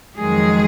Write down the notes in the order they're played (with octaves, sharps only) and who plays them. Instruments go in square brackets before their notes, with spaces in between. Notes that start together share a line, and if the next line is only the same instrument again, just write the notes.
[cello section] F2 D#3 F#3 G#3 G#4